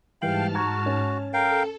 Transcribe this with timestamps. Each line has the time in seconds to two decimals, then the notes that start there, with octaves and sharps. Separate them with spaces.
0.22 G#2 E3 G3 F5 G5 A5 F6 F#7
0.55 F#4 A#5 C#6 G#6
0.86 C#4
1.33 A4 A#4 F5 G5